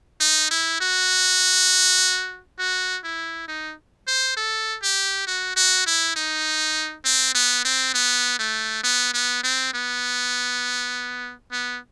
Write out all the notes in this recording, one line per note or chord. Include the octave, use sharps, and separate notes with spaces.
D#4
E4
F#4
F#4
E4
D#4
C5
A4
G4
F#4
F#4
E4
D#4
C4
B3
C4
B3
A3
B3
B3
C4
B3
B3